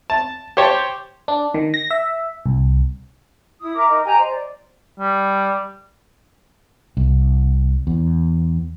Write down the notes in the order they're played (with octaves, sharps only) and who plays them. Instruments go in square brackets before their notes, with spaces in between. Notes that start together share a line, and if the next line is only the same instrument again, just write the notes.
[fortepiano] A5
G4 C5 C#5 A5
[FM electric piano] D4
D#3
A#6
E5
C2
[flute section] E4 D#6
A#4 E5 A#5 D6
D#4 A#4 D#5
G4 G5 G#5 A#5
C5 D#5
D5
[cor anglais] G3
[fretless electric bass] C2
E2